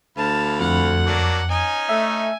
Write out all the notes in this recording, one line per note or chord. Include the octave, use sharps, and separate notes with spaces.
D2 F5 A5 B5
F2 F#5
F#3 A#3 D4
C#4 D#4 G#5
A3 E5